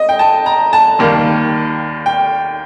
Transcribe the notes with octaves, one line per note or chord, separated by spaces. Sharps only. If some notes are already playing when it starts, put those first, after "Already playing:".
Already playing: D#5
G5
A5
A#5
A5
D#2 D#3 G3 A#3
G5